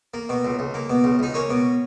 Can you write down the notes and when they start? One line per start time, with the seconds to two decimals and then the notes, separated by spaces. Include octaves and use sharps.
0.14 A#3
0.29 B2
0.45 C#2
0.59 C#2
0.74 A#3
0.89 B2
1.04 C#2
1.19 C#2 D#4
1.34 A#3 C#4
1.50 B2